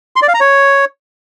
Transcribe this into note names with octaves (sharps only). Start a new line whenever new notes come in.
C6
D5
F5
A#5
C#5